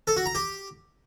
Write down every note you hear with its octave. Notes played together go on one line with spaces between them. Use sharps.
A4
F#4
A#5
G4